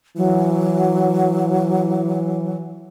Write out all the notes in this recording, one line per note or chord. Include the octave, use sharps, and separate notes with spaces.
E3 F#3